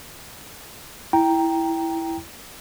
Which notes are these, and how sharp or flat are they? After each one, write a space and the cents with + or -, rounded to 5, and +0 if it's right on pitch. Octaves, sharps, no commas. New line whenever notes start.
E4 +0 G5 +0 A#5 +5